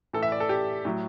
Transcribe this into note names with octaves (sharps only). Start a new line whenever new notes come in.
A2 E3 A4
E5
D5
A4
G4
A2 F#3